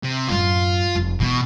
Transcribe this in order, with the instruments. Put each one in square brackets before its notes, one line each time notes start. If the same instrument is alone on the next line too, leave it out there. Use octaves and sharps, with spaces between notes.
[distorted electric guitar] C3
[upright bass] F#2 A2 [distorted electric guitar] F4
[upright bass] F1
[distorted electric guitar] B2 [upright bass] E3 E4